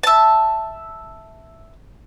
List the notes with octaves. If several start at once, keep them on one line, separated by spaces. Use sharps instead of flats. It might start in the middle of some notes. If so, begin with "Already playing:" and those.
E5 A5